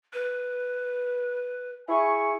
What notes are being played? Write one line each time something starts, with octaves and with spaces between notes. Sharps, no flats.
B4
E4 G#4 G#5 C#6